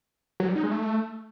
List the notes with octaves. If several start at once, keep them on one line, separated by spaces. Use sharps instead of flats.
F#3
G3
D#4
G#3
A3